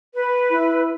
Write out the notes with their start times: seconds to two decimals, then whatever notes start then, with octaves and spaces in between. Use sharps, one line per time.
0.15 B4
0.51 E4